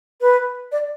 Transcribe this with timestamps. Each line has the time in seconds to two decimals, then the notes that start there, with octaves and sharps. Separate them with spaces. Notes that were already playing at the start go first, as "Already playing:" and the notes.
0.21 B4
0.72 D5